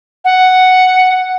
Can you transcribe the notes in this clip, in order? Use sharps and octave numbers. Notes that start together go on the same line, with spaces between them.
F#5